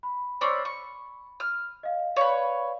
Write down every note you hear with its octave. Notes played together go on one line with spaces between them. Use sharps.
B5
C4 C#4 D5
C#6
F6
D#5 F5
B4 C#5 D5 F5